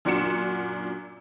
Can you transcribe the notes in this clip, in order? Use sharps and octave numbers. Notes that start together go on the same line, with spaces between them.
F#2 A#2 D4 F#4 C#7 E7